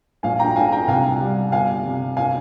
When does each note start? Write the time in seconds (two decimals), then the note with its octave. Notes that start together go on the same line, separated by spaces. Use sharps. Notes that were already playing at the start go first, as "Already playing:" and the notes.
0.23 A#1 F5 G#5
0.39 G5 A#5
0.55 G#3 F5 G#5
0.72 G5 A#5
0.88 C2 F5 G#5
1.20 G3
1.52 G1 F5 G#5
1.85 C3
2.17 F5 G#5